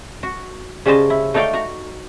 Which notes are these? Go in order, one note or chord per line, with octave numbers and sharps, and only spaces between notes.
F#4
C#3 G3 C#4 C5 D#5 A5
E4
A3 D#4 C#5 D5 F5 G5
F#4 A#5